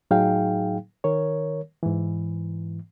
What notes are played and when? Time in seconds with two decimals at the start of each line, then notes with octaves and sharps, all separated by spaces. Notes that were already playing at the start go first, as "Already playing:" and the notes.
0.11 A2 F#3 D#4 G#4 F5 G5
1.04 D#3 A#4 C#5
1.83 G#2 E3